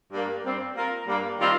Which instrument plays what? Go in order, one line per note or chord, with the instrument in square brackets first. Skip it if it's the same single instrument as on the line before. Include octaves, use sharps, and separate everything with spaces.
[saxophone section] G2 G3 A#3
G2 G3 C4
A#3 F4 A#4
G2 G3 A#3
D#3 G3 C4 F4